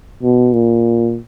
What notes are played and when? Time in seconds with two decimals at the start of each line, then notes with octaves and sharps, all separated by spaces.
0.23 B2
0.53 A#2